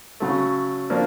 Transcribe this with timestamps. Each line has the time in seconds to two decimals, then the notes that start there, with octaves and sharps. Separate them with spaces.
0.20 C#3 F#3 A3
0.90 F3 A#3 D4